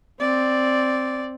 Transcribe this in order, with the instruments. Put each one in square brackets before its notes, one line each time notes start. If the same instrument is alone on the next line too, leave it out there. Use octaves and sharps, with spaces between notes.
[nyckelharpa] C4 [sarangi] D5